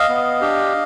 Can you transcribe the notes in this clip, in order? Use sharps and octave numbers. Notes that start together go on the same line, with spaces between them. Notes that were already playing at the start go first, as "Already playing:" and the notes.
Already playing: D#5 F5
B3
D4 G4